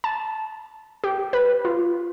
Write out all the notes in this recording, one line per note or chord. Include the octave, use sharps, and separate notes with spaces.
A5
G4
B4
F4